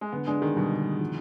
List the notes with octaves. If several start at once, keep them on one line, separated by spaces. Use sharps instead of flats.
G#3
D3 B3
G#3 D4
D#3 G#4
B2 G3
D3
D4
F3